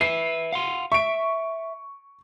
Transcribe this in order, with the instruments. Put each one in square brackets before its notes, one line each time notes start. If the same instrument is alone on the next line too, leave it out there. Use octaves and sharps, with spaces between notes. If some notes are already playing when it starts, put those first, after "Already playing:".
[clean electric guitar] B4 E5 [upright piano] C7
[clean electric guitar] F5 F#5 C6
[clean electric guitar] E5 [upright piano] C#6 D7